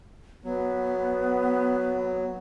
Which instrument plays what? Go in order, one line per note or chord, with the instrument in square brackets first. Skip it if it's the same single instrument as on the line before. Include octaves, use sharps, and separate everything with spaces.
[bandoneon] F#3 [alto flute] B3